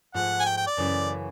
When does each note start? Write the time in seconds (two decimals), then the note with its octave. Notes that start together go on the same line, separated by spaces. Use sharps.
0.14 G#2 F3 A3 F#5
0.40 G#5
0.45 G5
0.57 G5
0.67 D5
0.77 F#2 C#3 E3 A3